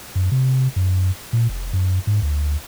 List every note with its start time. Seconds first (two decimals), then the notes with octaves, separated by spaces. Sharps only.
0.15 F#2
0.32 C3
0.76 F#2
1.33 A#2
1.49 F1
1.73 F#2
2.07 G#2
2.22 D2